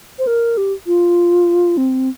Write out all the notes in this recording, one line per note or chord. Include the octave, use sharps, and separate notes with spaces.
C5
A#4
G4
F4
C4